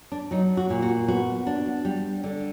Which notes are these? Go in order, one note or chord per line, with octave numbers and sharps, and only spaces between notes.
D4
F#3 D#4
F#4
A#2
F#4
B3 F#4
D4
G3
D3